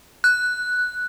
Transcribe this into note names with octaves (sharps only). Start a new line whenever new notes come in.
F#6